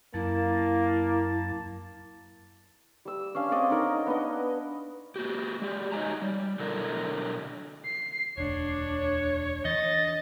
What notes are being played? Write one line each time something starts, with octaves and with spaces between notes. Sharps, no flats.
F#2 A#3 E4 A5
G3 E6
C#4 D4 F5 G#5
C4 D5 D#5 F#5
C#4 D#4 A#4 D#5
B3 D4 D#5
A#3 F#4 G4
G#3 G4
D#4 F#4 C#5 D#5 G#5 A#5
G3
B2 D3 F#3 E4 A4 A#4
C7
E1 D2 D4 C#5
E3 D4 D#5 A6